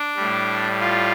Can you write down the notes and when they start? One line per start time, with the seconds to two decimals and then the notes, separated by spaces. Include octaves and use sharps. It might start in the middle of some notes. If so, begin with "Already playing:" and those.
Already playing: D4
0.16 A2 G3
0.81 F4